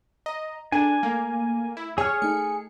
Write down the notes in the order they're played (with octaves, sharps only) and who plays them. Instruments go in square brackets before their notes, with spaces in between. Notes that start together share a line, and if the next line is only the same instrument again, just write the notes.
[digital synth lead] D#5 [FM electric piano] A#5
[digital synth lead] D4 [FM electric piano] G#4 A4 A#5 [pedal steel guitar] G#5
[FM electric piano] A3 [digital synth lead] A#3
[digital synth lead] E4
[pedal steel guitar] G#4 F6 [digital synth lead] C#5 [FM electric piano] D5
[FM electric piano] A3 D#4 A5 [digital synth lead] C#7